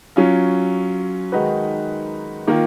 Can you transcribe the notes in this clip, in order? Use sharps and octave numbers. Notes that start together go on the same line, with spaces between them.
F#3 C#4 F4
D#3 G#3 D#4 F#4 B4
D#3 A#3 F4